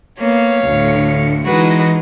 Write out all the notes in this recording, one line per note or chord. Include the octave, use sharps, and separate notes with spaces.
A#3 B3 C#5 F5
D2 A2 D3 C#7
E3 G#3 D#4 F#4 B4